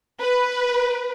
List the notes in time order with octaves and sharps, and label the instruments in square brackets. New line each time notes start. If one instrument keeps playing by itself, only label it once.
[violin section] B4